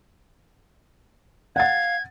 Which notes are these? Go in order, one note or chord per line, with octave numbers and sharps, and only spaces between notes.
F5 F#5 G#6 A6